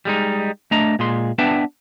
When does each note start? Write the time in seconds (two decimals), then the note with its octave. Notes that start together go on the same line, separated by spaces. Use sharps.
0.05 G3 G#3 D#4
0.71 A3 D4 D#5 A#5
0.99 A#2 G#3 C6
1.38 B3 D4 B4 E5 G5 A5